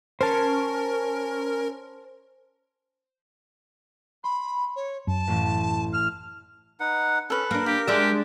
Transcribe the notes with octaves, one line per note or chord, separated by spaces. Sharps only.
C#4 A#4 C5 A5
B5 C6
C#5
F#2 A5
A1 A2
F6
D#4 B4 F#5
C#4 A4 B4
A#3 D4 A#4
G4 F5
G#3 D4 G4 E5